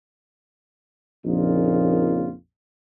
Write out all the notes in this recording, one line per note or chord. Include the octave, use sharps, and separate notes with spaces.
A#1 F2 A#2 C#3 D#4 F4